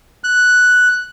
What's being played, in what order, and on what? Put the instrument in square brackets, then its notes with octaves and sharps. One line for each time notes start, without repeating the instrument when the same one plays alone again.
[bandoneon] F#6